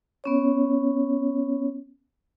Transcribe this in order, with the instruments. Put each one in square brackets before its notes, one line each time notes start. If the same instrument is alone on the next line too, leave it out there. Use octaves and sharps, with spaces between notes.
[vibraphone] B3 C#4 C#5